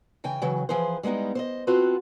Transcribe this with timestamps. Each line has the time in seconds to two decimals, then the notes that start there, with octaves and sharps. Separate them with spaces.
0.24 C#3 E3 G5 G#5
0.42 C#3 E3 F#3
0.69 E3 F3 G#4 B4 C5
1.03 G3 G#3 B3 D#4 E4
1.35 C5 D5 D#5
1.67 C4 F4 F#4 A4 B4 C5